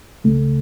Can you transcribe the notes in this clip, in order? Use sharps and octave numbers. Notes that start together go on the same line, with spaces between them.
C#2 C#3 A3